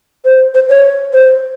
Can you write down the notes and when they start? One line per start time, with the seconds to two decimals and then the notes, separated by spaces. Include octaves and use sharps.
0.25 C5
0.54 C5
0.69 C#5
1.13 C5